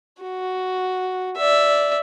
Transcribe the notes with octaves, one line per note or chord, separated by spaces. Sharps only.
F#4
D5 E5